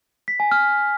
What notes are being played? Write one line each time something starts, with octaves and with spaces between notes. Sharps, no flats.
B6
G#5
F6